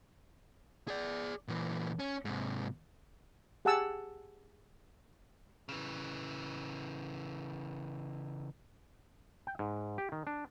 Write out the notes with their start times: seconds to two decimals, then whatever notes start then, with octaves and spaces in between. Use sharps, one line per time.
0.88 G#4 D5
1.48 A#2 E3
1.99 C#4
2.25 G#2 C3
3.65 G4 G#4 F#5 G#5 A5 E6
5.69 C#3 E3
9.47 G5
9.59 G#2
9.98 G4
10.12 D#3
10.27 D4